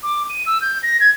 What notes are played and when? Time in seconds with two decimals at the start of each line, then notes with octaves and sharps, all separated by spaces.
0.03 D6
0.30 D#7
0.46 E6
0.62 G6
0.83 A#6
1.00 G#6